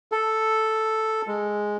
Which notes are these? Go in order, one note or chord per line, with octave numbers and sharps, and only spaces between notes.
A4
G#3